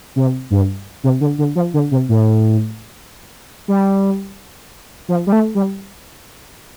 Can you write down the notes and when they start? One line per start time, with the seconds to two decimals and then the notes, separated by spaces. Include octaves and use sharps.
0.16 C3
0.51 G2
1.04 C3
1.21 D3
1.38 D3
1.56 F3
1.74 D3
1.91 C3
2.09 A2
3.68 G3
5.09 F3
5.27 G3
5.32 A3
5.55 G3